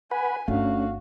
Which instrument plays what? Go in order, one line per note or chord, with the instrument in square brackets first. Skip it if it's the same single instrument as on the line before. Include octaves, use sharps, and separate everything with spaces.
[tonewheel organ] B4 F#5 B5 [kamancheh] G#5
[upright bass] G1 [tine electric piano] A3 D4 [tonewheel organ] C#4 [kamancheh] F#4 F5